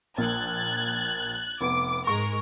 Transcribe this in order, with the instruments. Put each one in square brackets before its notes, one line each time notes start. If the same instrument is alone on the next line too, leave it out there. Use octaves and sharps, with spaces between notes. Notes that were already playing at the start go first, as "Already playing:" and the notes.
[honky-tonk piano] A#1 A#3 [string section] F#6 G#6 A6
[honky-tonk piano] F1 B3 [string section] D6
[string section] G#2 G#3 A#4 [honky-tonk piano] C#6